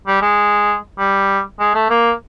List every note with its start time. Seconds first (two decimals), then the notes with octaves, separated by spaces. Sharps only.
0.07 G3
0.22 G#3
0.98 G3
1.60 G#3
1.75 A3
1.90 A#3